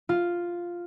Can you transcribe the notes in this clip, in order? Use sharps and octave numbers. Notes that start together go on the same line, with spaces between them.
F4